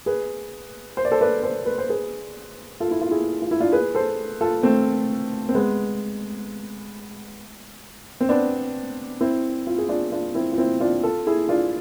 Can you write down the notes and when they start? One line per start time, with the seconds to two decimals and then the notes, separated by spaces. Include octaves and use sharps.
0.06 G#4 B4
0.97 C5
1.05 D5
1.12 A4 C5
1.21 B4 D5
1.43 A4 C5
1.66 B4
1.78 C5
1.89 G#4 B4
2.80 F4 A4
2.91 E4
3.02 F4
3.11 E4 G#4
3.42 F4
3.51 E4
3.60 D4 F4
3.72 G#4 B4
3.95 A4 C5
4.41 F4 A4
4.63 A3 C4
5.49 C4
5.54 G#3 B3
8.21 C4
8.29 B3 D4
9.21 C4 E4
9.67 F4
9.78 G#4
9.89 D4 F4
10.12 D4 F4
10.35 C4 E4
10.53 F4
10.58 C4 E4
10.80 D4 F4
11.03 F4 A4
11.27 E4 G#4
11.49 D4 F4